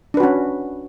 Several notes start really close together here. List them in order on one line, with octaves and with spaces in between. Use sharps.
D4 B4 F#4 C#4